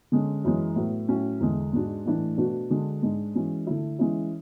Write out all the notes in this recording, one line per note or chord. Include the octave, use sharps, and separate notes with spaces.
D3 G#3 C#4
F#2 E3 G#3
A2 F#3 B3
A2 F#3 C#4
E2 D3 G#3
G#2 G#3 D4 F#4
A2 E3 A3 D4
B2 A3 D4 F#4
D3 G#3 D4 F#4
G#2 G#3 D4
E3 G#3 C#4 F#4
D3 A3 E4
E3 G#3 C#4 E4